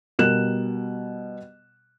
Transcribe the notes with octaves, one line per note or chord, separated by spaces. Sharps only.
B2 G3 A#4 F#6 E7